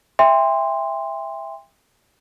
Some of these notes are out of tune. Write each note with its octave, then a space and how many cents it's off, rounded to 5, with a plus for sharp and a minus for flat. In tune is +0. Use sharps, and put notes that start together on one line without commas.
E5 +0 G5 +35 C6 -5